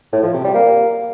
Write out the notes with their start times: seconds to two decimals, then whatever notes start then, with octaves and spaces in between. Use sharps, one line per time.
0.13 A2
0.23 F3
0.34 C3
0.44 G3
0.55 A#3